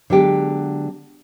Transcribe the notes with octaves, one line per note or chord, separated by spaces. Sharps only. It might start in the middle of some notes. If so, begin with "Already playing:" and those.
D3 F#3 G#3 B3 G4